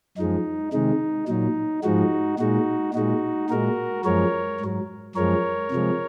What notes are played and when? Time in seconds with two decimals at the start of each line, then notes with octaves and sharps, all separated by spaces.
0.18 F#2 F3 G#3 D#4
0.73 C3 D#3 G#3 D#4
1.28 A#2 F#3 D#4
1.84 G#2 F3 G#3 D#4 F#4
2.39 A#2 G#3 D#4 F#4
2.94 A#2 G#3 D#4 F#4
3.50 A#2 G#3 F#4 A#4
4.05 F#2 F3 G#3 A#4 C#5
4.61 G#2 F#3
5.16 F#2 F3 G#3 A#4 C#5
5.71 C3 F3 G#3